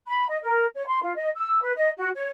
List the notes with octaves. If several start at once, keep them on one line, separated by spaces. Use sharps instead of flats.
B5
D#5
A#4
C#5
C6
F4
D#5
E6
B4
D#5
F#4
C#5